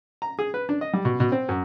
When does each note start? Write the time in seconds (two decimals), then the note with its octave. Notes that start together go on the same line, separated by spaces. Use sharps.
0.22 A#5
0.39 G#4
0.54 B4
0.69 D4
0.81 D#5
0.93 G3
1.05 B2
1.20 B2
1.32 C4
1.49 F#2